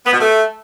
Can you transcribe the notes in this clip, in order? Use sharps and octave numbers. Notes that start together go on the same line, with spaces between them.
B3
B2
A3